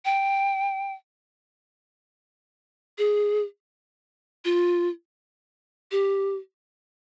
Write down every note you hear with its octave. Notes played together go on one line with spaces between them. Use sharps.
G5
G#4
F4
G4